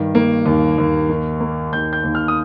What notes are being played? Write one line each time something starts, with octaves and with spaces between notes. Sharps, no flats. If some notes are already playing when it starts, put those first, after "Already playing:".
Already playing: G2 D#3
A#3
D#2
D#2
D#3
A#3
D#2 G6
G6
D#2
F6
D#6